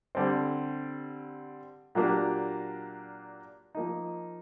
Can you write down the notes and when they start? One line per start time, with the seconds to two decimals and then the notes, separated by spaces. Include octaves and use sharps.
0.15 D3 G3 C4
1.95 A#2 F#3 A#3 D4 G4
3.75 F3 A#3 D#4